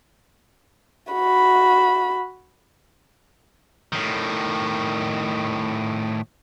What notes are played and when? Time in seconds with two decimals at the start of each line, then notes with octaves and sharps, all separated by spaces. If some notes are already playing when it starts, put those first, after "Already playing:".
1.13 F#4 B5
3.93 A2 D#3